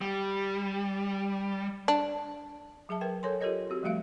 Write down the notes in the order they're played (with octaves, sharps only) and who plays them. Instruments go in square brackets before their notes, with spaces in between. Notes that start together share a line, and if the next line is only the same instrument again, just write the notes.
[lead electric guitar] G3
[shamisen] D4
[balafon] F#3 G#4 E5 A5
A#4 B4 G5
A4 A#4 C#5 G#5 C6
F4 G4 A4 A#4 C#5 D#5
C4 F#4 G4
F3 G3 A3 F#4 E5 F5